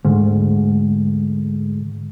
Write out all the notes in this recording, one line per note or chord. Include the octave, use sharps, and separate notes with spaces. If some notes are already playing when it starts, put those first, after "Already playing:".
D2 G#2